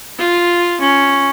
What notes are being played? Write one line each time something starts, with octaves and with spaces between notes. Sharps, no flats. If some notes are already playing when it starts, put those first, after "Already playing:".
F4
C#4